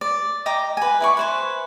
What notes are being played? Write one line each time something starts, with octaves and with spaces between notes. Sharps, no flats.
D5
D#5 G5 A#5 D6
B4 G#5
E4 D5 C#6
B4 C5 G#5